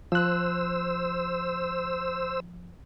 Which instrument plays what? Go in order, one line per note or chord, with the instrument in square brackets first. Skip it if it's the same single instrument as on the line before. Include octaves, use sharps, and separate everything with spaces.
[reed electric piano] F3 F#6 [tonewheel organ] C5 E6